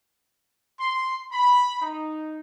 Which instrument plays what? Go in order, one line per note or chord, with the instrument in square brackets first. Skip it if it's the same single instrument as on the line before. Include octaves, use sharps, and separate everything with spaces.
[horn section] C6
B5
D#4